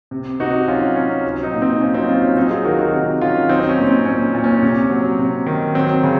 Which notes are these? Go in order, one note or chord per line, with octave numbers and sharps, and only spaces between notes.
C3
C3 D#4 F#4
F#3 C#4 F4
C3 C#4
F#3
C4 D#4
A#2
C4 D#4
F#3 C#4 F4
C4 D#4
F#3 C#4 F4
C#4
F#3 C4 D#4
F4 G#4
D#3 F#4 A#4
D#4 F#4
C3 D#4 F#4
D#3 C#4 F4
F#3 C4 D#4
C#4
A#2
C4
A#2 C#4
A#2
C#4
C3
F#3
C3
D#3
F#3 C4
C#3